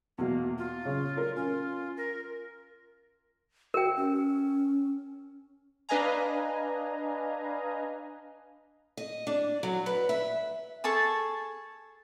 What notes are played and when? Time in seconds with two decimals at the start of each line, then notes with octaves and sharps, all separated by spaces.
0.18 E2 B2 A#3
0.58 F4
0.85 C#3
1.17 A#4
1.36 C#4 F4
1.97 A#4
3.74 F#4 A#4 G5
3.96 C#4
5.89 D4 B4 D#5 F5 G#5 A#5
8.97 D#5
9.27 D4
9.63 F#3
9.86 B4
10.09 E5
10.84 G#4 A4 A5 C#6